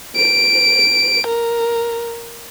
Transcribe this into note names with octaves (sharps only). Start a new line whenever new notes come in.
D7
A#4